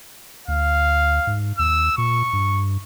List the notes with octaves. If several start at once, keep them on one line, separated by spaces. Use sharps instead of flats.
D2 F5
G#2
D#2 E6
A#2 C#6
G2